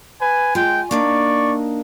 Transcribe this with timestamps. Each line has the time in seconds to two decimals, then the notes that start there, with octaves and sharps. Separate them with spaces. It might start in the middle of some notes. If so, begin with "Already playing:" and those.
0.20 B4 G#5
0.55 G#3 F4 G5 G#5
0.91 A#3 D4 D#4 D5 C#6